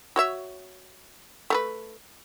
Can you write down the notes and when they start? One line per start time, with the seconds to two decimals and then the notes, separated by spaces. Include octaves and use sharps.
0.16 F#4 C#5 E5
1.50 A3 A#4 B4